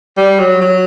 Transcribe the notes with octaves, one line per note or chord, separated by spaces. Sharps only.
G3
F#3
F#3